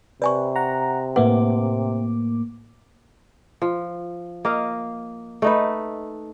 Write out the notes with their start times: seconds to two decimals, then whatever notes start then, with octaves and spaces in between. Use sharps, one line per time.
0.22 C3 B4 D5 G#5 C#6
0.56 F#5 A#5
1.16 A2 A#3 B4 E5 F#5 D6
3.62 F3
4.45 A#3 D#5 F5
5.42 A3 D#4 B4